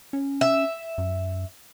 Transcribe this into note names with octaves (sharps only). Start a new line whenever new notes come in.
C#4
E5
F#2